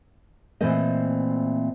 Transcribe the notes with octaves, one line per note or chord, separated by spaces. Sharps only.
A#2 E3 A3 C4 C5 D#5